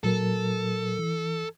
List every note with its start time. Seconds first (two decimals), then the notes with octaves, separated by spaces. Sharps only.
0.04 A#2 F#3 A4 A#4
0.99 E3